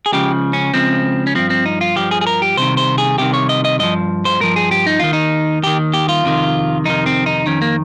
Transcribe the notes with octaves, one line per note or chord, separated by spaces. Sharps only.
G#4
C#2 C#3 F3 G4
C#4
C#2 C#3 F3 C4
C#4
G2 F3 C4
C4
D#4
F4
G2 F3 G4
G#4
G#4
A#4
G4
C2 C3 D#3 C5
C5
G#4
C2 C3 D#3 G4
C#5
D#5
D#5
G2 F3 D#5
C5
G2 F3 A#4
G#4
G4
D#4
D#2 D#3 F4
D#4
D#2 D#3 G4
G4
F4
F2 C3 D#3
F2 C3 D#3 D#4
C4
D#4
F2 D#3 C#4
A#3